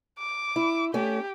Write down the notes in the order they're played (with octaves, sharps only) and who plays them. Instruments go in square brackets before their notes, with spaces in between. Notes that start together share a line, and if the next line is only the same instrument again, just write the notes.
[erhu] D6
[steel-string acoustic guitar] E4
[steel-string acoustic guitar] A3 C#4 [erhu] G4